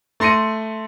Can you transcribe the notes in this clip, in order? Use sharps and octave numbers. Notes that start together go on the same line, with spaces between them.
A3 C6 A#6 C#7 D#7